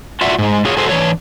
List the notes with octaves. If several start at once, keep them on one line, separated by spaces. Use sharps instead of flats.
F4 F#4 D5 E5 F#5
G#2 G#3
F4 F#4 G#4 C#5
F#4 G#4 A4 C5
E3 F3 D4 C#5